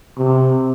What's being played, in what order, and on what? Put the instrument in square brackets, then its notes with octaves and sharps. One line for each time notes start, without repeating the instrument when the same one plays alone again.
[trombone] C3